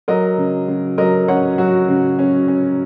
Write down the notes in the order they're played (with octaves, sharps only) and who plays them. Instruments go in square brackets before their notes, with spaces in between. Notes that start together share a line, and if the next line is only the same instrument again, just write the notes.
[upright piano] F#3 A#4 D#5
C#3
C#3
F#3 A#4 D#5
C#4 C#5 F#5
F#3 F#4
C#3
C#4
C#4